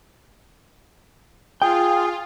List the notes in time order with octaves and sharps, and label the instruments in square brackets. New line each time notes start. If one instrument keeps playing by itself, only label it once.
[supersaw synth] F4 [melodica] G#4 [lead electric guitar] G5